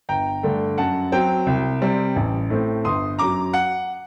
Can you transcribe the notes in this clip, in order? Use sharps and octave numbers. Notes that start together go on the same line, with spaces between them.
G1 G5 A#5
G2 D3 A3
F#2 F#5 A5
F#3 C4 G5
C2
C3 G3 C4
A1
A2 A3 C4
G1 C6 D#6
F#2 F#3 A#5 D6
F#5